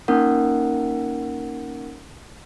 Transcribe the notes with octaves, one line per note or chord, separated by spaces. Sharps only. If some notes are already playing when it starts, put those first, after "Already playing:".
A#3 C#4 D#4 A#4 F#5